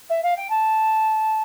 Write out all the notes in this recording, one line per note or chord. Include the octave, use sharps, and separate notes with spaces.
E5
F5
G5
A5